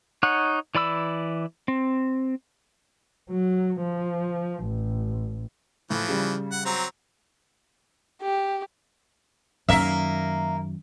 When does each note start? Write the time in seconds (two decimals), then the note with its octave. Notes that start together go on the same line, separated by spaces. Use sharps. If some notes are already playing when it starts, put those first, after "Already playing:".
0.23 D#4 C#5 F#5
0.75 E3 D5 B5 E6
1.68 C4
3.30 F#3
3.80 F3
4.64 A1
5.90 A2 E3 F3
6.08 C#3 G3
6.51 F#5
6.65 F#3 C4 A#5
8.23 G4
9.69 F#2 D#3 A#3 E5